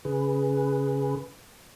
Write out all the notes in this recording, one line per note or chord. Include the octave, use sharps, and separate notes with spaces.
C#3 G#4 B4